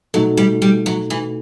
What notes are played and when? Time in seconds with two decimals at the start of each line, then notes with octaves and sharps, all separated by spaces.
0.14 B2 F#3 A3 D#4 F#4 A4
0.37 G3
0.62 G3
0.86 F#3
1.10 E3